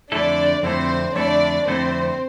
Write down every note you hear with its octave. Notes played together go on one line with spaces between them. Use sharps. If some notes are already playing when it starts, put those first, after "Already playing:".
F2 D3 A3 D4 E4 A4 D5
F2 D3 A3 C4 E4 A4 C5
F2 D3 A3 D4 E4 A4 D5
F2 D3 A3 C4 E4 A4 C5